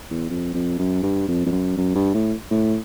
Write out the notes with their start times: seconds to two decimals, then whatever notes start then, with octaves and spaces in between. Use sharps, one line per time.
0.11 E2
0.30 F2
0.54 F2
0.79 F#2
1.03 G2
1.28 F2
1.46 F2
1.52 F#2
1.77 F#2
1.95 G2
2.14 A2
2.51 A2